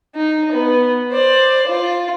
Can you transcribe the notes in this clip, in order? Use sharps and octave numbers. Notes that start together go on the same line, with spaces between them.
D#4
B3
C5 D5
F4